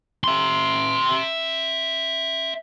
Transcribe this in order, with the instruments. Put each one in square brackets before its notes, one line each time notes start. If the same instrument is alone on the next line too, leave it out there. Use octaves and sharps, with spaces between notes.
[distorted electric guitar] E5 C6